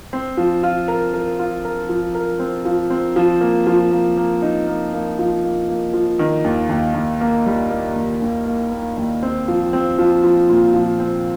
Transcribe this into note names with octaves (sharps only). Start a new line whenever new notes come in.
C4
F3
F4
A#4
A#4
F4
A#4
F3
A#4
C4
F3
C4
F3
A#3
F3
A#3
A#3
D#4
A#3
A#3
F3
A#3
A#3
F3
D#3
D#2
D#2
D#2
A#3
G3
A#3
D#2
D#2
A#3
A#3
D#2
C4
F3
C4
F3
F3
A#2
F3
C4